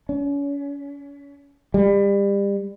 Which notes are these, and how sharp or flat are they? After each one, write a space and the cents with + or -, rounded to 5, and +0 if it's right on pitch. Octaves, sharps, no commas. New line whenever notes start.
C#4 +35
G3 +30